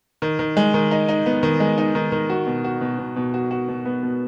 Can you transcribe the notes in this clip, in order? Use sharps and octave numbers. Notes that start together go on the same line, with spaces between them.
D#3
D#3
G#3
D#3
D#4
D#4
B3
D#3
G#3
D#4
D#3
D#3
F#4
B2
F#4
B2
B2
B2
F#4
F#4
B2
B3
B2